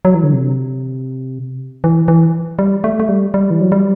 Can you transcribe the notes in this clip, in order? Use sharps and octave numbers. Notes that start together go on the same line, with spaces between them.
F#3
E3
D3
C3
E3
E3
G3
A3
A3
G3
G3
E3
F#3
G3